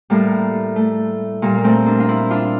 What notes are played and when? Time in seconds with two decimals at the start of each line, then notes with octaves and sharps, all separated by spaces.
0.10 A2 G3 A#3
0.76 A3
1.42 A#2 G3 A#3
1.57 A#3
1.64 A3 C4
1.86 A#3 D4
2.00 F4
2.08 C4 E4
2.30 D4 F4